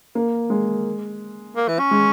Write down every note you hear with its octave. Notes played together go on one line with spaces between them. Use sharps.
A#3
G#3
A#3
E3
C#4
G#3